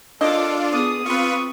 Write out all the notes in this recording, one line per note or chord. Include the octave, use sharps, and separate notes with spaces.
A#3 C4 D4 F4 A4 D#5 D6
B3 G#4 D5 D#6
C4 F4 B4 C#6